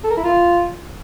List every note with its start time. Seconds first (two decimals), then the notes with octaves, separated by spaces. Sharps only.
0.04 A4
0.10 A#4
0.17 E4
0.24 F4